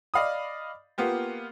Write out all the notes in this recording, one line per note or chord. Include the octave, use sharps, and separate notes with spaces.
D5 D#5 F5 B5 D#6
A#3 B3 F4 G4